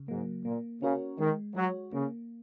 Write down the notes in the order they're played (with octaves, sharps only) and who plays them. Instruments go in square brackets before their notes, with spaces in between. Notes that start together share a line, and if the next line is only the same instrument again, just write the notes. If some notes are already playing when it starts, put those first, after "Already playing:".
Already playing: [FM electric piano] C#3
[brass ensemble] G#2 [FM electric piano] F#3 A#3
[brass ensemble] A#2 [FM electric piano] A#3
[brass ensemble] C#3 [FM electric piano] C#4 F#4 A#4 C#5
[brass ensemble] D#3 [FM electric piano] G#3
[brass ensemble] F#3 [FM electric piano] F#4 C#5
[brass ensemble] C#3 [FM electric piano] A#3